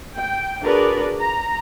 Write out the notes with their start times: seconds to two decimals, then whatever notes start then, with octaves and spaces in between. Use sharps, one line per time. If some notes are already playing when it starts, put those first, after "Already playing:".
0.17 G5
0.62 D4 F#4 G#4 A#4 B4 D5
1.20 A#5